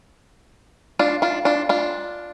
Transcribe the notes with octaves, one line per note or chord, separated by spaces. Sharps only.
D4 F4
D4 F4
D4 F4
D4 F4